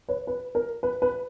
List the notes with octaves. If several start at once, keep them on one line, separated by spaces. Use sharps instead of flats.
B4 C#5
B4
A#4
B4
B4